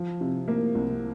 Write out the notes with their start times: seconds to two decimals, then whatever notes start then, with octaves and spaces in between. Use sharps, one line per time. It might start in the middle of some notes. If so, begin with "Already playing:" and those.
Already playing: F3
0.21 C3
0.48 A#3
0.75 C2